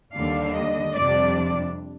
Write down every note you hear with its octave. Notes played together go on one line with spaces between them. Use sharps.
D#2 D3 G3 D4 F5
D#5
F2 C3 G3 D4 D5